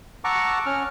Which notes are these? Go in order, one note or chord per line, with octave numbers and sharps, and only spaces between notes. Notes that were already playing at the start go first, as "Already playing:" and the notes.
F#5 A5 A#5 C#6 D6 E6
C#4 F6